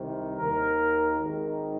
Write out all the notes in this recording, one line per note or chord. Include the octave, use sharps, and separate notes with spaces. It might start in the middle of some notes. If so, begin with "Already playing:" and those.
Already playing: C2 C3 D#3
D#2 D#3 A#4
G#1 G#2 D#3